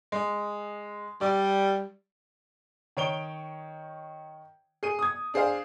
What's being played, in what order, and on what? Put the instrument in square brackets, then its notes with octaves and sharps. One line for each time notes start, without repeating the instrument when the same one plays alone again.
[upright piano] G#3
[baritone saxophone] G3 [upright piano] D5
[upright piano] D#3 C#5 D7 G7
G#4 D#7
D#6 G#6
D4 G#4 C5 F5